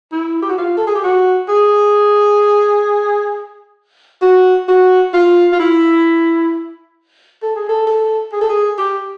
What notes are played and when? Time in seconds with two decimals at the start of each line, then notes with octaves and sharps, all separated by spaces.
0.12 E4
0.42 G4
0.49 F#4
0.58 F4
0.77 A4
0.87 G#4
0.95 G4
1.04 F#4
1.49 G#4
4.22 F#4
4.68 F#4
5.14 F4
5.52 F4
5.59 E4
7.42 A4
7.56 G#4
7.69 A4
7.87 A4
8.32 G#4
8.41 A4
8.49 G#4
8.78 G4